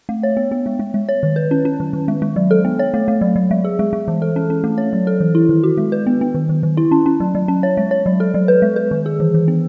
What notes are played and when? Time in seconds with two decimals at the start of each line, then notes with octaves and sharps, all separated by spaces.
0.09 A3
0.23 C#5
0.37 B3
0.51 B3
0.66 G#3
0.79 G#3
0.94 G#3
1.09 C#5
1.23 D#3
1.36 B4
1.51 C#4
1.65 C#4
1.80 D#3
1.93 D#3
2.08 G#3
2.22 G#3
2.36 F#3
2.51 A4
2.65 B3
2.79 C#5
2.94 A3
3.08 A3
3.21 F#3
3.36 F#3
3.51 G#3
3.65 G#4
3.79 G#3
3.93 G#3
4.08 E3
4.22 A4
4.36 C#4
4.50 C#4
4.64 A3
4.78 C#5
4.93 F#3
5.07 A4
5.20 E3
5.35 E4
5.49 D#3
5.63 F#4
5.77 G#3
5.92 B4
6.07 B3
6.21 B3
6.34 D#3
6.49 D#3
6.63 D#3
6.77 E4
6.91 C#4
7.06 C#4
7.20 F#3
7.35 F#3
7.48 C#4
7.63 C#5
7.77 G#3
7.91 C#5
8.06 F#3
8.20 A4
8.34 F#3
8.48 B4
8.62 G#3
8.76 B4
8.91 D#3
9.06 G#4
9.20 E3
9.34 E3
9.48 B3